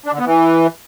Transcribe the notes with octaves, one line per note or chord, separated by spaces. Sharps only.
D4
D3
B3
E3